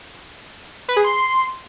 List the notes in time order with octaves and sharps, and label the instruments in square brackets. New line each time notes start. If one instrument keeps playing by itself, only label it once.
[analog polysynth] B4
G#4
C6